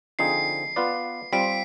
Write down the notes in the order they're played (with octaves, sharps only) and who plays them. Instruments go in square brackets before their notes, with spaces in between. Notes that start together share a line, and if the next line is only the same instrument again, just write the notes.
[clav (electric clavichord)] D3 F3 C4 D#4 G#4 [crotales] C7
[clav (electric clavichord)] B3 F4 B4 D5
[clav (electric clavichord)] G3 C4 F4 [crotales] B6 D7